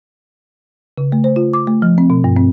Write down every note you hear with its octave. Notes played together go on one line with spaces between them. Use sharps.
C#3
A3
C5
F4
D6
A3
F3
C4
B2
G2
C4